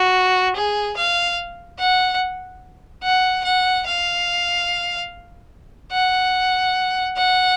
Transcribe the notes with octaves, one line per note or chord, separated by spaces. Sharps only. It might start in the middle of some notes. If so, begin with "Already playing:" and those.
Already playing: F#4
G#4
F5
F#5
F#5
F#5
F5
F#5
F#5